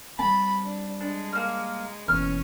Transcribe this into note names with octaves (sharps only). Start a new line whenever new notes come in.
G3 C4 A5 B5
D4
G#3 D4
A#3 F6
F#1 B2 E3 C#4 F6